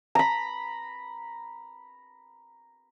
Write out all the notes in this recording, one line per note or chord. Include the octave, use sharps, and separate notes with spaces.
A#5 B5